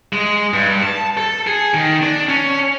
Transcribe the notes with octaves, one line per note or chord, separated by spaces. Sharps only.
G#3
G2
A5
A4
G#4
D#3
D4
C#4